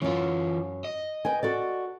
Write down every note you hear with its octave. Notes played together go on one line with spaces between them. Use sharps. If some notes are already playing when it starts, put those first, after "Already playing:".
F#2 E3 C#4 F4
D#5
B4 G5 G#5
F#4 A4 D5